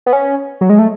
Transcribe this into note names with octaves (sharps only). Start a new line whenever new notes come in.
B3
C#4
F#3
G#3
A3